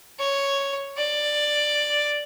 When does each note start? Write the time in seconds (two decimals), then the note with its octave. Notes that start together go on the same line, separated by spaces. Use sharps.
0.19 C#5
0.98 D5